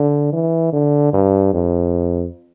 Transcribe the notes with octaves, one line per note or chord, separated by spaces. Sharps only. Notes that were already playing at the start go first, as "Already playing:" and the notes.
Already playing: D3
E3
D3
G2
F2